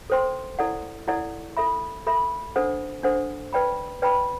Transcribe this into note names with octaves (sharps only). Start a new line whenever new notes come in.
A4 C5 G5 C6
E4 A4 D5 F#5
E4 A4 D5 F#5
A4 E5 B5
A4 E5 B5
D4 A4 C5 F#5
D4 A4 C5 F#5
B4 D5 G5 B5
B4 D5 G5 B5